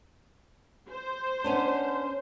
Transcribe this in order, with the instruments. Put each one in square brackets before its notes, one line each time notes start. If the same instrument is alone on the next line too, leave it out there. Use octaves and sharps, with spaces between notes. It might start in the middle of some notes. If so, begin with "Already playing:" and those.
[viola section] C5
[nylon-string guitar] B3 C#4 D4